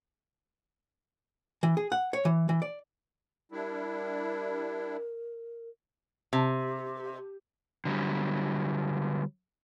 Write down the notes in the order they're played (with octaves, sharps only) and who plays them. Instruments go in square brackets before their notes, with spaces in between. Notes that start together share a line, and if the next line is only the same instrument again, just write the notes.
[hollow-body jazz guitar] E3
G#4
F#5
C#5
E3
E3
D5
[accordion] G3 D4 E4 [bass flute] A#4
[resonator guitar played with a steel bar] C3
[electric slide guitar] D3 F#3 G3